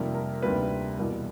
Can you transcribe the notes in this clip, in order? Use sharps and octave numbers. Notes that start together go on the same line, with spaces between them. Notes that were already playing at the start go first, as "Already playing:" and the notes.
Already playing: F2 C3 D#3 G3 A#3
A#4
D2 C3 D#3 G3 A#3 B4
E2 B2 G3 A#3